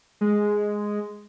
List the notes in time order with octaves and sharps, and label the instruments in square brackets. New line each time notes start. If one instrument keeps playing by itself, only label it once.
[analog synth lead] G#3